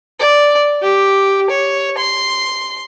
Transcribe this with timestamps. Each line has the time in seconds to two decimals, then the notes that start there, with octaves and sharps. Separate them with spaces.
0.20 D5
0.82 G4
1.50 C#5
1.98 C6